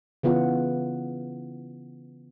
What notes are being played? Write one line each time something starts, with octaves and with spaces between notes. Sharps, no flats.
C#3 E3 B3 F4 F#5